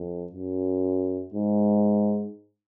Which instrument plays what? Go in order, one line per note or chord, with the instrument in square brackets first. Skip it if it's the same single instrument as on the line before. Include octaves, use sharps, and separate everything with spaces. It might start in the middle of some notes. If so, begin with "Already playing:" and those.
Already playing: [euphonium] F2
F#2
G#2